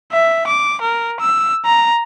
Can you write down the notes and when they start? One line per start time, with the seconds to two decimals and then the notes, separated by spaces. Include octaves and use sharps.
0.12 E5
0.47 D6
0.81 A#4
1.20 E6
1.65 A#5